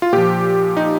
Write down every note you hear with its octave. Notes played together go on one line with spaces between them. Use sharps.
F4
A#2 F3 G4
D#4